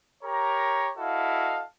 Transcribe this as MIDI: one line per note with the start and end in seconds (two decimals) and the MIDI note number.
0.23 0.88 67
0.23 0.88 70
0.23 0.88 73
0.23 0.88 82
0.96 1.63 64
0.96 1.63 66
0.96 1.63 69
0.96 1.63 75
0.96 1.63 77